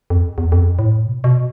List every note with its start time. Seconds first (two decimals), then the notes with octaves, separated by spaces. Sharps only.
0.10 F2
0.38 E2
0.52 F2
0.79 A2
1.06 B2
1.24 B2